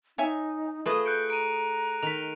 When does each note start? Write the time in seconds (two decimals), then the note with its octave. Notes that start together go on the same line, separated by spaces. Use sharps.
0.18 D#4 C#5 E5 G#5
0.86 A3 F4 G#4 B4 D#5 D#6
1.06 F#6 G6 C#7 D7
1.30 A#5 D7 D#7
2.03 D#3 B6 F7